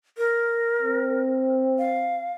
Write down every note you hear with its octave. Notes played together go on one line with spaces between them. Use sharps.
A#4
C4
F5